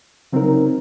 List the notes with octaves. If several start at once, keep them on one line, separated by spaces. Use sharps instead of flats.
C#3 F#3 C4 D#4 A#4